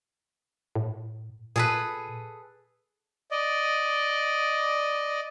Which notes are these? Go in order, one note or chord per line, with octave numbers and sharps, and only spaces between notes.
A2
A#2 G#4 A4 B4
D5 D#5